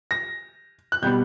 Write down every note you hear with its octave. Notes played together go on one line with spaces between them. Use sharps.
A#6
F#6
B2 G3 B3 G6